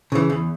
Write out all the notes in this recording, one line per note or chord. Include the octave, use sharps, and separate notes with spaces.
C#3 E3
E2